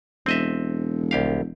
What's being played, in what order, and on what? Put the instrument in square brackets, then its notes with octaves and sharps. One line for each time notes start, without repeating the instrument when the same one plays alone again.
[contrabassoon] E1 [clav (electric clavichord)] C4 D#5 E5
[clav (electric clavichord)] C2 G4 F5